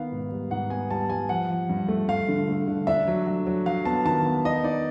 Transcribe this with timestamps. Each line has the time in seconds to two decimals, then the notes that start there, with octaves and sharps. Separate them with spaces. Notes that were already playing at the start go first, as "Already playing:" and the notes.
Already playing: D#3 B3 F5
0.12 G#2
0.32 G3
0.51 G#2 F#5
0.70 B3 G#5
0.91 G3 A5
1.10 G3 G#5
1.29 F3 F#5
1.50 F3
1.69 G2
1.88 A3
2.08 G2 F5
2.28 D3
2.49 A3
2.68 D3
2.87 D4 E5
3.08 F#3
3.26 F#3
3.47 F#3
3.66 F#3 F5
3.85 B3 A5
4.05 D#3 A5
4.25 B3
4.45 D#4 D#5
4.64 D#4 D5